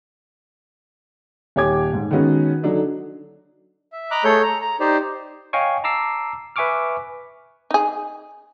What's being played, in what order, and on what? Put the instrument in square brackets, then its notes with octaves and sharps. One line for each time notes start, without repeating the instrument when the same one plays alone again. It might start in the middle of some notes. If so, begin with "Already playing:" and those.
[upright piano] D#1 G4 C#5 G#5 D6 G#6
G#2
D#3 G#3 B3 C#4 F#4
D3 F#3 D4 D#4
[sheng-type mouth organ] E5
D#5 A#5 B5 D6 F#6
A3 G#4 A4 C#5 G6
A#5
A#5
D#4 G4 C5 D5
[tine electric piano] C#5 D#5 F5 G5 G#5 C#6
A5 A#5 D6 E6 C7
B4 E5 G#5 C#6 D6 F6
[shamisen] D#4 G#4